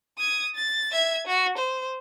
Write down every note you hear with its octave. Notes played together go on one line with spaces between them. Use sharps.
D#6 G#6
A6
E5 G#6
F#4
C5